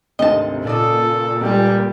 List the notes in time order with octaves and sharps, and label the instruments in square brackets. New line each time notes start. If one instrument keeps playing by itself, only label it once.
[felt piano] G#1 D2 [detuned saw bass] C3 [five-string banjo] D#5 A5
[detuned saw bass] A#2 [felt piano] C#3 D5 D#6 [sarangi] A4
[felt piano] C#2 G#5 [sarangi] G3